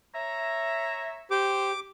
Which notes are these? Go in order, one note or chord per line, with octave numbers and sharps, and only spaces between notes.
C#5 E5 A#5
G4 C5 D6